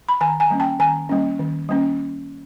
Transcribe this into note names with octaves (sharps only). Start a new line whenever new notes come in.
B5
D#3 G#5 A#5
G#5 A#5
G3 A#3 C#4
G5 A5
D#3 G#5 A#5
G3 A#3 C#4
D#3
G3 A#3 C#4